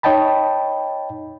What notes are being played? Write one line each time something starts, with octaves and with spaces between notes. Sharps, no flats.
D#4 C#5 D#5 G5 A5 B5